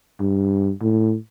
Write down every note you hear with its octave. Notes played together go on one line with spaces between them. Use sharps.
G2
A2